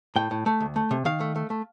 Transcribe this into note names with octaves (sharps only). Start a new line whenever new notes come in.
A2 G5
A2
A3
D2
A3
C3
D#3 F5
A3
A3
A3